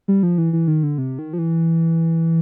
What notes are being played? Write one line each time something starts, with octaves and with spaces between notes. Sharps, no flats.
G3
F3
E3
E3
D#3
D3
C3
D#3
F3
E3